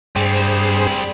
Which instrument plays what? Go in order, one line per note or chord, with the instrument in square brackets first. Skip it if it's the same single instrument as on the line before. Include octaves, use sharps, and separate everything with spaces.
[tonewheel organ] G2 G#4 C5 [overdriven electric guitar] G3 C4